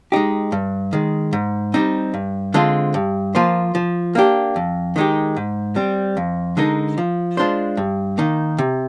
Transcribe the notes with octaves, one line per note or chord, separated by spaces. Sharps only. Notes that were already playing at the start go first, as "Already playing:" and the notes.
G#3 D#4 G4
G2
D#3 G#3
G#2
G3 C4 D#4
G2
D3 G#3 C4 F4
G2
F3 A#3 F4 C5
F3
A#3 D4 G4
F2
D#3 G#3 D#4 G4
G#2
G3 C4
F2
D3 G#3 D#4 A#4
F3
G#3 D4 F4 C5
G2
D#3 A#3 D#4
C3